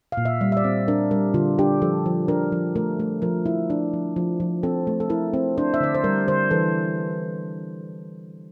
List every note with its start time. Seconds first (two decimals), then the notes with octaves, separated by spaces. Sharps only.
0.12 F5
0.17 A#2
0.25 E5
0.41 G3
0.52 E5
0.57 D5
0.64 C4
0.88 D4 A#4
1.11 G3 A#4
1.34 D3 F4
1.59 D4 G4
1.82 F3 A4
2.06 F3
2.28 D4 A#4
2.52 F3
2.76 A3 A#4
3.00 A3
3.22 F3 A#4
3.46 E4
3.70 D4
3.93 F3
4.16 F3
4.40 F3
4.63 C4 A4
4.87 A3
5.00 A4
5.10 E4 A#4
5.34 C4
5.58 D4 C5
5.74 E5
5.80 D3 D5
5.95 C5
6.04 G3 A#4
6.28 D3 C5
6.51 E3 A4